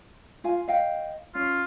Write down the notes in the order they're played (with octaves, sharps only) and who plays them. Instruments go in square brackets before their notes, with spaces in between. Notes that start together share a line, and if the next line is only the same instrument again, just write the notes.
[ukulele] F4 F5 G#5
D#5 F5 G5
[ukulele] C#4 [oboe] F4